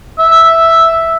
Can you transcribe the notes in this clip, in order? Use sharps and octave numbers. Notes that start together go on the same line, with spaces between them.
E5